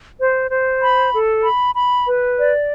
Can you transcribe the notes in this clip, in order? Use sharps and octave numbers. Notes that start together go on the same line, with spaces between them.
C5
C5
B5
A4
B5
B5
B4
D5